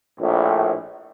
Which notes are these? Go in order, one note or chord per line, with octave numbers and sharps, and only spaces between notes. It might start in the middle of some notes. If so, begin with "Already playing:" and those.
A#1 A2